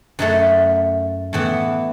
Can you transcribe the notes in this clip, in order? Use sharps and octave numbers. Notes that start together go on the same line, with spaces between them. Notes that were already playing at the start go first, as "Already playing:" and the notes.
F#2 F#3 A3
A2 E3 B3 E4